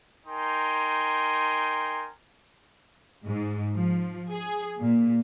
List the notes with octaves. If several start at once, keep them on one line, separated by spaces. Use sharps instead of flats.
D#4 A#4 G5 G#5 C6
G#2
F3
G#4
A#2